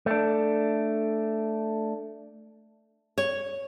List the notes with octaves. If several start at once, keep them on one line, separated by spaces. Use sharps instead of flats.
A3 D4
C#5